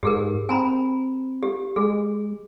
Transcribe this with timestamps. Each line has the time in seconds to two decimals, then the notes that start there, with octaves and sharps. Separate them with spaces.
0.03 G#2 G4 G#4 A#4
0.49 C4 G#5 A#5 B5
1.43 G4
1.76 G#3 G#4